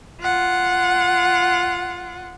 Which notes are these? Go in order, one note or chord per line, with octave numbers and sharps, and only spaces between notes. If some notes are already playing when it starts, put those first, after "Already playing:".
F4 F#5